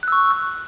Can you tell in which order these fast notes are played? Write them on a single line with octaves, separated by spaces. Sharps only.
F#6 E6 C#6